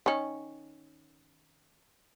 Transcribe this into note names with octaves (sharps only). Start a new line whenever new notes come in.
D#3 C#4